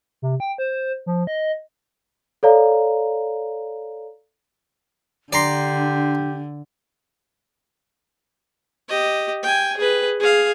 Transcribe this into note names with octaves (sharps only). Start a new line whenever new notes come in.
C3
G5
C5
F3
D#5
A4 C#5 D5 F5 A#5
D3 D4 G4 D5 A#5 C6
G4 D#5
G5 G#5
G#4 B4
G#4 F5